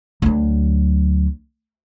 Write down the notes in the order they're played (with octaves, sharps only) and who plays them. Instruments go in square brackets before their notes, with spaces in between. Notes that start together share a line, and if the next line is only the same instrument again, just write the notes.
[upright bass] D2 F#3